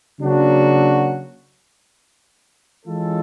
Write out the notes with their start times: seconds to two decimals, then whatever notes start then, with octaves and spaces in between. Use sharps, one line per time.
0.21 C#3 F#3 A#3 D4 F#4
2.84 E3 G#3 C#4 F4 A4